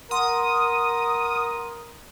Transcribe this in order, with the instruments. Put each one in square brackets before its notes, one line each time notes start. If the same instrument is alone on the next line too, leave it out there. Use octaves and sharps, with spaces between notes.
[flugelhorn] A#4 [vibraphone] F#5 C6 [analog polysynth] D#6